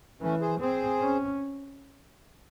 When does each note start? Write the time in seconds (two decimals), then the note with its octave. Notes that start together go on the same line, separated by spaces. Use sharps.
0.21 E3 A3 C#4
0.41 G#4 C5
0.61 C4 G#4 C5
1.01 C#4